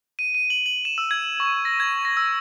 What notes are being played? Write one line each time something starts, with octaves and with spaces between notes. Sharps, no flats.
D#7
D#7
F#7
F#7
E7
E6
G#6
C#6
A#6
G#6
A#6
E6